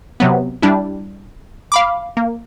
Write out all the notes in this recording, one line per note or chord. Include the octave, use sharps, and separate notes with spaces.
C3 F#3 B3
G3 D4 E4
F5 B5 D6
A#3